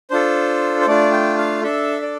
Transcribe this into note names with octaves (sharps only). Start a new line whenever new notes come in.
D4 F4 A4 C5
C5
A3 D4 F4 D5
G5
F5
D4 A4 E5
D5